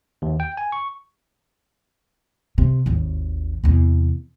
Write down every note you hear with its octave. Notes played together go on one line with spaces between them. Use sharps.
D#2
G5
G#5
C#6
C3
G#1 D#2
E2 C3